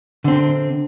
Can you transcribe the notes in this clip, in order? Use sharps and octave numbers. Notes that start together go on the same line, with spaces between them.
D3 C4